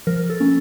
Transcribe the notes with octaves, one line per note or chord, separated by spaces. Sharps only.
F3 A#4
A4
A#3 C#4